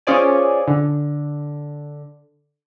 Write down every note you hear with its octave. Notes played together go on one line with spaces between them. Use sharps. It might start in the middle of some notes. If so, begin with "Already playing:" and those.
C#4 F4 G#4 C5 D5 G#5
D3